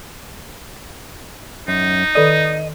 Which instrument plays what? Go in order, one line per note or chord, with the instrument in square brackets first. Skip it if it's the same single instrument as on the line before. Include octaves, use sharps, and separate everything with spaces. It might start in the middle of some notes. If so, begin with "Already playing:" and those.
[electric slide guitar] F#2 [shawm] D#4
[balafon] D#3 A4 D5 [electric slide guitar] D#5